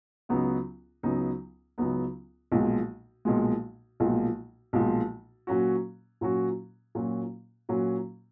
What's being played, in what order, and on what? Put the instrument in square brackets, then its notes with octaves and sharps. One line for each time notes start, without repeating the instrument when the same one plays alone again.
[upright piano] C#2 C#3 F#3 B3 D#4
C#2 C#3 F#3 B3 D#4
C#2 C#3 F#3 B3 D#4
B1 A#2 F3 G#3
B1 A#2 F3 G#3
B1 A#2 F3 G#3
B1 A#2 F3 G#3
A#2 F#3 C#4 F#4
A#2 F#3 C#4 F#4
A#2 F#3 C#4 F#4
A#2 F#3 C#4 F#4